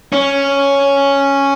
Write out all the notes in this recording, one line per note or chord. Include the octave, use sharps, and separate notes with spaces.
C#4